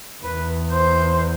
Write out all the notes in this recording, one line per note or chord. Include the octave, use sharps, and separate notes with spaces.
E2 B4
C5